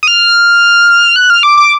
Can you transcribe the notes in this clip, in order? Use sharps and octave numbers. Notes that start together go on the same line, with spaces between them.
D#6
F6
F#6
F6
D6
D6